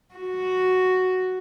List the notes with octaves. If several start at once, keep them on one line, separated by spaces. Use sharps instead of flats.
F#4